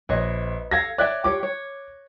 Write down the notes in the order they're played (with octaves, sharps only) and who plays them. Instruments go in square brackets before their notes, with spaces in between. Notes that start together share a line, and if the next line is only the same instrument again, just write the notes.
[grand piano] A#1 [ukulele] B4 C#5 D#5
[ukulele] A4 F5 [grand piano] G#6 A#6
[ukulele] C#5 E5 G5 [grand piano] D5 F#6
[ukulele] F4 G4 C#5 [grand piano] D6
[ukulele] C#5